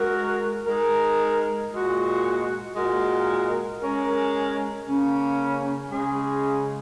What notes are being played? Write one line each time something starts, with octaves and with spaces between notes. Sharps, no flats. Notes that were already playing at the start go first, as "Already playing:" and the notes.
Already playing: G#3 F#4 A#4
G#3 D#4 A#4
A#2 G#3 F#4
A#2 G#3 F#4 A#4
G#3 C#4 A#4
C#3 A#3 C#4
C#3 G#3 C#4 G#4